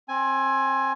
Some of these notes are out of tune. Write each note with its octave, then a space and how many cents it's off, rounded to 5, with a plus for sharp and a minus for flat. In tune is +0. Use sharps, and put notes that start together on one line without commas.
C4 +25 G#5 +5